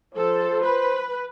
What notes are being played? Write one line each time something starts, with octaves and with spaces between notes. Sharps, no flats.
F3 A4 C5
B4